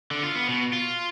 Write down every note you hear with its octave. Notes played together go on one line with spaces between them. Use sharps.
D3
F4
B3
B2
F4